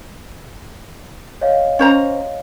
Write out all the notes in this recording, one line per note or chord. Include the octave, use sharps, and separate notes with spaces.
C#5 D#5 F5
C#4 C5 A#5